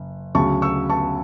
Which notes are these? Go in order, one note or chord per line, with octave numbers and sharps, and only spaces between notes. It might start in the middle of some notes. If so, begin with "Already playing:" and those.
Already playing: F#1
D2 C#3 F#3 A5 C#6
C#6 E6
A5 C#6